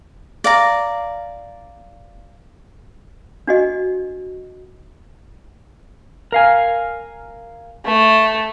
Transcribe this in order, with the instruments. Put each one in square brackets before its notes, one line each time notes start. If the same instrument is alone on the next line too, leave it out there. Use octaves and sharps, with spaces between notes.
[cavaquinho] D5 F5 A#5
[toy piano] D4 F#4 D#5
[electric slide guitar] A#4 F5 G#5
[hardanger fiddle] A3